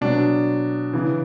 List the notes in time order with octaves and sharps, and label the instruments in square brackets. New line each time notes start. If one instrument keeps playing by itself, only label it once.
[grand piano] B2 F#3 D4
C#3 E3